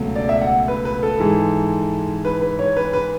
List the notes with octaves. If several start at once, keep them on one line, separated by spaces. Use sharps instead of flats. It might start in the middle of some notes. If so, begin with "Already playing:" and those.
Already playing: C#2 B2 F#3 A3
D5
E5
F#5
B4
B4
A4
G#2 E3 G#3
B4
B4
C#5
B4
B4